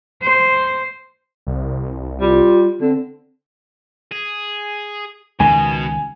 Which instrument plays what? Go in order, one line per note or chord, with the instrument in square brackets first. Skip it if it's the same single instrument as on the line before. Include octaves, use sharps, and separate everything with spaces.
[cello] C5
[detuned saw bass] C2
[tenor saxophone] G3 [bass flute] F4
[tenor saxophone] D3 [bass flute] C4
[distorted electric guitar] G#4
[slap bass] C#2 D#3 [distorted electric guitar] B2 [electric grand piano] G#5